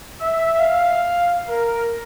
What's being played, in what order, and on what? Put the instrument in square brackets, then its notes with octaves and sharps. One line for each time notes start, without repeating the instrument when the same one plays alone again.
[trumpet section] E5
F5
A#4